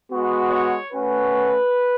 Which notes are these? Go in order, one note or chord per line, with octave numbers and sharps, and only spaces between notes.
G#3 B3 F#4
C#5
A3 C#4 F#4 B4